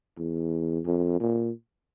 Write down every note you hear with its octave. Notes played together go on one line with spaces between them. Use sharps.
E2
F2
A#2